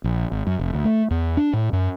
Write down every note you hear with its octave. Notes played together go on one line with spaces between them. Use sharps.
A#1
G#1
F#2
F1
D2
A3
E2
D4
A2
F#2